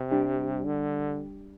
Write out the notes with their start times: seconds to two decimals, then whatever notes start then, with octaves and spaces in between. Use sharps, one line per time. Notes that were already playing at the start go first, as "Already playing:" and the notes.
Already playing: C3
0.11 G3 D4 G4
0.66 D3